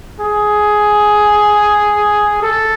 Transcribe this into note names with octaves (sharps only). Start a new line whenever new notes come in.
G#4
A4